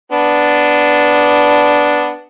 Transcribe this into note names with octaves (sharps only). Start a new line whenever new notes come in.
B3 D4